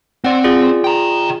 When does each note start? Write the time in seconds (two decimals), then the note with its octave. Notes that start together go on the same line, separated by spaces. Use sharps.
0.24 C4 D5 F#5
0.44 F4 G#4 D5
0.84 G5 A#5